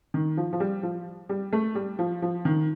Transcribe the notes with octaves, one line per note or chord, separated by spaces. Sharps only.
D#3
F3
F3
G3
F3
G3
A3
G3
F3
F3
D#3